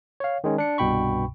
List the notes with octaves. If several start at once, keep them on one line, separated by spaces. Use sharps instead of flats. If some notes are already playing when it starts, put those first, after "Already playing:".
C#5 F5
D#3 G#3 C#4
D4 C#7
C2 G2 B2 G5 B5 C#6